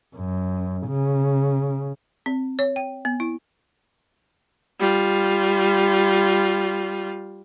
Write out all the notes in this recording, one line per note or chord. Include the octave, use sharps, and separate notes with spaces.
F#2
C#3
C4
C#5
G5
B3
E4
G3 F4